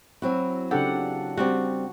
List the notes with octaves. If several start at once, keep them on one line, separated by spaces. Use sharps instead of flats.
F#3 C4 E4 F#4
C#3 D4 G4 A4 F#5
G3 C4 F#4 G4